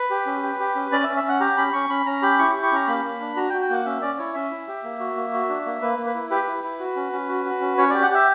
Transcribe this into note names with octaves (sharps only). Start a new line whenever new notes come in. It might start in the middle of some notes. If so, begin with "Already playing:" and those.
Already playing: B4
G4
C#4
G4
G4
C#4
C#4 D5
E5
C#4
E5
C#4 F#5
G4 A#5
C#4 B5
C#4 C#6
C#4 B5
C#4 A#5
G4 B5
E4 C#6
C#6
G4
C#6
C#4 A#5
A#3 B5
A#3
D4
F#4 A#5
G5
F#4
G5
A#3 F#5
C#4 E5
C#4 D5
E4 C#5
C#4 E5
E4
G4
A#3
F#4
A#3
F#4
D4
A#3
A#3 B4
A#3
B4
E4
G4 B4
E4
E4
F#4
C#4
C#4
F#4
F#4
C#4
C#4 C#5
G4 D5
F#5
G4 E5